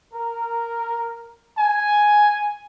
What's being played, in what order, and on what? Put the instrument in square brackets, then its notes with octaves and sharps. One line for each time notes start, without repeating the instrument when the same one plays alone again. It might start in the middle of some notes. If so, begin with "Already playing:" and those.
[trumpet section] A#4
G#5